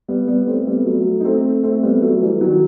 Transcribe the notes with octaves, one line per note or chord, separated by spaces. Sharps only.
G3 B3
G3 B3
A3 C4
G3 B3
F#3 A3
D#4
A3 C4
A3 C4
G3 B3
F#3 A3
E3 G3
D#3 F#3